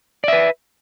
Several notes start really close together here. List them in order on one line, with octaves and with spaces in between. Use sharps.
D5 E5 B4